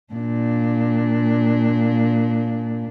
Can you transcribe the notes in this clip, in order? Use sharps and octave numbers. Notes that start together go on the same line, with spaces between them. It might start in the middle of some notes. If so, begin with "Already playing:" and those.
A#2 D4